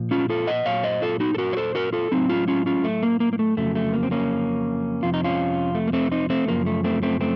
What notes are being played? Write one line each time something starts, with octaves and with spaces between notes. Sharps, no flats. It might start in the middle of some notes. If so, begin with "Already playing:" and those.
Already playing: A#2 F3
C#4 F4
F4 A4
D#5 F#5
A#2 F#3 C#5 F5
C5 D#5
F4 A4
D#4 F#4
A4
F#4 A#4
C#5
A4 C5
F#4 A#4
F4 A4
A2 F#3 C4 D#4
C#4 F4
C#4 F4
C#4 F4
A3
A#3
A#3
A#3
A3
F2 C#3 F#3 A3
A3
A#3
C4
A#3 C#4
F2 C3 F3 F4
D#4
C#4 F4
A3
A#3
A3 C4
C4 D#4
A3 C4
F#2 C#3 F3 A#3
A3
A3 C4
A3 C4
A3 C4